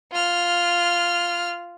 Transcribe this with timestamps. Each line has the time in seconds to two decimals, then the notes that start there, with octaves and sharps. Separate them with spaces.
0.12 F4 F6